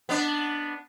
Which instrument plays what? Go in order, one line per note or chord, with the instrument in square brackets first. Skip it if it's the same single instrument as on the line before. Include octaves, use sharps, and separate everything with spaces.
[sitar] B3 D4